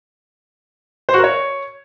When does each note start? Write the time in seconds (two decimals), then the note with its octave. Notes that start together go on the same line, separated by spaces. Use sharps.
1.09 C5
1.14 F#4
1.19 A#4
1.24 C#5